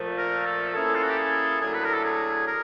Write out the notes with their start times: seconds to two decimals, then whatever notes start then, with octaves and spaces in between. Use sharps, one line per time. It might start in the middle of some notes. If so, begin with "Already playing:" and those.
Already playing: A#2 F3 A3
0.18 A#4
0.46 A4
0.74 A#3 C#4 E4 G#4 A4
0.95 F4
1.03 F#4
1.10 G4
1.18 G#4
1.60 A2 F#3 A3 D4 G#4
1.74 B4
1.85 A#4
1.94 A4
2.04 G#4
2.47 A#4